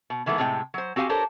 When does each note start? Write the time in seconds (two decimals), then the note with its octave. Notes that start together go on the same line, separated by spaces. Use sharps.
0.10 B2
0.26 D#3 E3 G#3 A3 B3
0.38 A2 C3 G#3 D#4 G5
0.74 F#3 C5
0.96 C4 F#4 G4 F5 G#5
1.09 D4 G4 A4 A#4 C5 C#5